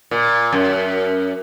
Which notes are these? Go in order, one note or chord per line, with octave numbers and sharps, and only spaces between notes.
A#2
F#2